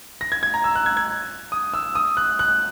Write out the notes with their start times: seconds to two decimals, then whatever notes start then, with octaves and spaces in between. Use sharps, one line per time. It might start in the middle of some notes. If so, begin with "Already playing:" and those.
0.21 A#6
0.32 G#6
0.43 G#6
0.54 A#5
0.64 E6
0.75 F#6
0.86 G#6
0.97 G#6
1.52 D#6
1.74 E6
1.95 D#6
2.17 F#6
2.39 F#6